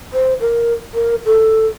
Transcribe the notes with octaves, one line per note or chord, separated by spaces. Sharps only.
C5
A#4
A#4
A4